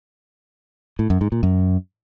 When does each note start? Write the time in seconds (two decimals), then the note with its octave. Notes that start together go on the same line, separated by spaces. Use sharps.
0.99 A2
1.10 F#2
1.21 G#2
1.32 A#2
1.43 F#2